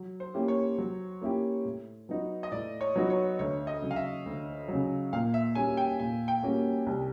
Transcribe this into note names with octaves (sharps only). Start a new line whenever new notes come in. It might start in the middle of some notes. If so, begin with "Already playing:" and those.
Already playing: F#3
C5
A#3 C#4 E4 G4
C#5
F#3
A#3 C#4 E4 G4
A2
F#3 B3 D#4 F#4
D#5
A2 D5
C#5
F#3 B3 D#4 F#4
C#5
D2 C#5
D#5
C#3 F#3
F5
E5
D2
C#3 F#3
A#2 F5
E5
G3 A#3 C#4 F#4 G#5
G5
A#2 G#5
G5
G3 A#3 C#4 F#4
C2